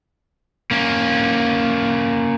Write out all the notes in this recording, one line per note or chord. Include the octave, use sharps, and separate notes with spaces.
A#3 C#4